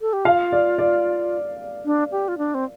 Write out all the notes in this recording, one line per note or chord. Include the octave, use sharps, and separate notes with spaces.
A4
G4
F4 F5
D5
D5
D4
G4
F4
D4
C4